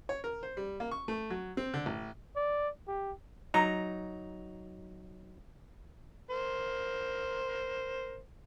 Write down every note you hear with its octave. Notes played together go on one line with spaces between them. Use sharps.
C#5
A#4
C5
G3
A#3
C#6
A3
F#3
C4
D3
A1
D5
G4
F#3 D#4 A#5
A#4 C5